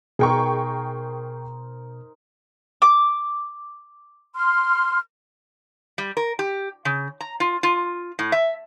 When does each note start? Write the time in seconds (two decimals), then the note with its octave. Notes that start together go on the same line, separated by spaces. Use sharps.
0.19 B2 D#4 G#4 A#4 C5 G5 C#6
2.82 D6
4.35 C6 F6
5.98 G3
6.17 A#4
6.39 G4
6.85 C#3
7.21 A#5
7.40 F4
7.63 F4
8.19 A2
8.32 E5